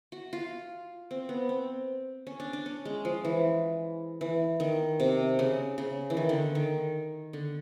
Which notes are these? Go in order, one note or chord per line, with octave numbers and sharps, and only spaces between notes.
F#4
F4
C4
B3
C4
C#4
D4
D4
C#4
G#3
F3
E3
E3
D#3
C3
C#3
C#3
E3
D#3
D3
D#3
D3